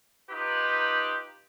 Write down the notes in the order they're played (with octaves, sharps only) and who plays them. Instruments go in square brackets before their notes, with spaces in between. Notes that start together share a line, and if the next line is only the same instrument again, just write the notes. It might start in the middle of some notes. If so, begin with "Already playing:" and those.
[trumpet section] D#4 F4 G4 B4